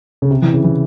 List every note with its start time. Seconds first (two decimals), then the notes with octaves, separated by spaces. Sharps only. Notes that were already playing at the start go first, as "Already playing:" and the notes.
0.22 C#3
0.31 C3
0.42 E3
0.54 C#3
0.64 E3